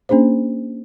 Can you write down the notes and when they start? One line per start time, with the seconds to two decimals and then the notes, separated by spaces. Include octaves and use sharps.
0.09 A#3 C#4 D4 G#4 C5